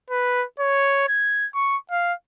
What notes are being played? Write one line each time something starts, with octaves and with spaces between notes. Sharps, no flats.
B4
C#5
G#6
C#6
F5